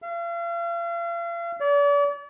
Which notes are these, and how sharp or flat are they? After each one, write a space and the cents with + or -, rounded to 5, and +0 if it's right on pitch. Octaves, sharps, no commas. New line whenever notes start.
F5 -40
D5 -40